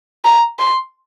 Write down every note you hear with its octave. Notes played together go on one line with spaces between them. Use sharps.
A#5
C6